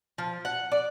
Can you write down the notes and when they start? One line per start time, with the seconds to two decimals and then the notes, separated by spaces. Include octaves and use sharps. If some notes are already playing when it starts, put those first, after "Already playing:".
0.18 F3
0.45 F#5
0.72 D5